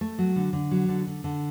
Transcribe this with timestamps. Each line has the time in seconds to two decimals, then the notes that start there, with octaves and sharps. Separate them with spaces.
0.01 A3
0.18 F#3
0.36 D3
0.53 D3
0.71 F#3
0.89 D3
1.07 D3
1.24 D3